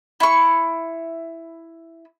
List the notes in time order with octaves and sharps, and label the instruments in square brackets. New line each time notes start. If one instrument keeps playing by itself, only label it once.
[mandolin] E4 C#6